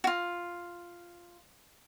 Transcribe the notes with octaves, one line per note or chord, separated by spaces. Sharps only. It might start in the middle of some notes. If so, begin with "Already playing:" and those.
F4 F#4